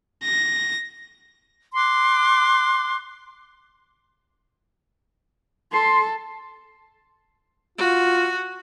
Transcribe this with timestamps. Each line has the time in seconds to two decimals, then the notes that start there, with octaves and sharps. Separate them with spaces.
0.23 A#6
1.74 C6 D6 F#6
5.72 A4 C6
7.78 F4 F#4